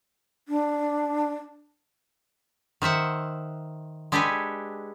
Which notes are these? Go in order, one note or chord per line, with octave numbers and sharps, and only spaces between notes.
D4
D#3 C5 E5 F#5
G#3 D4 G4 A4 B4 G#5